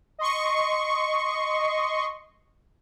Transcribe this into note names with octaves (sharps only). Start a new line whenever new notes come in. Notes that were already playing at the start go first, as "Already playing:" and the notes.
D#5 C6 C#6